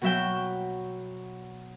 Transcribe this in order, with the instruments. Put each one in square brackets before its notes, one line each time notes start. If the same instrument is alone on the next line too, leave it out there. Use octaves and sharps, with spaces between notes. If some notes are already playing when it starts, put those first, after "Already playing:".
[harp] B2 F#3 E5 G5